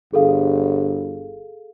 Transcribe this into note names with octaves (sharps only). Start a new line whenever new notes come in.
G1 G#4 A4 F5